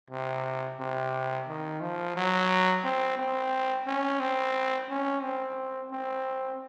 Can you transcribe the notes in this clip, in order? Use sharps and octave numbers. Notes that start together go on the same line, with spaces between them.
C3
C3
D#3
F3
F#3
C4
C4
C#4
C4
C#4
C4
C4